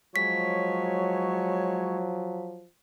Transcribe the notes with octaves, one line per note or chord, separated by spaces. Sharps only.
F3 F#3 G#3 C#5 B6